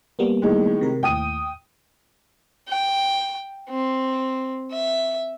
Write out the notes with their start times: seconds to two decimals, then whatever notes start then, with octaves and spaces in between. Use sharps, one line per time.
0.19 G3 A#3 B3
0.42 A2 D#3 G#3
0.81 C3 A#4
1.03 D#2 A2 G5 D#6 D#7
2.69 G5
3.69 C4
4.72 E5